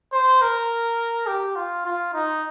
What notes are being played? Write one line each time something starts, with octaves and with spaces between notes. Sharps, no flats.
C5
A#4
G4
F4
F4
D#4